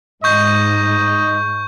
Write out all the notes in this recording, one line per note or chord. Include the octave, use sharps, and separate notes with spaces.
G#2 D#4 D#5 C#6 G6